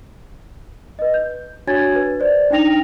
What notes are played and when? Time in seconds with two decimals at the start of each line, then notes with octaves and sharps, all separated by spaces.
0.99 B4 D#5
1.14 G6
1.67 D4 F#4 C#5 G#5 G#6 A6
1.95 B4
2.20 C5 D5
2.50 D4 D#4 G5 A#6 F7